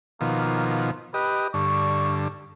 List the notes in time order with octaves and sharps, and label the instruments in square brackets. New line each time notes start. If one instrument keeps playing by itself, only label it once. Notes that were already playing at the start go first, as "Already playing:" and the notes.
[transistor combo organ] B2 D#3 F3 [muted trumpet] A#3
[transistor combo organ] G4 D#5 [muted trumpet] B4
[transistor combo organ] G2 D3 [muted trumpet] C#6